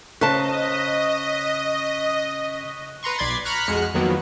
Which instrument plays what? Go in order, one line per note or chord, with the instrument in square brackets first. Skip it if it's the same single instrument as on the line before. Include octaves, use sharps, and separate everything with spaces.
[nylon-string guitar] C#3 C5 A5 [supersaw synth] D#5 [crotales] C#6 F#6 B6
[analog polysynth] B4 A#5 C6 C#6
B1 D5 B5 C6 G#6 A6
A#5 B5 C#6 F6 F#6
F2 G#3 F#4 F6 F#6 C#7
F2 D#3 F#3 A#3 B3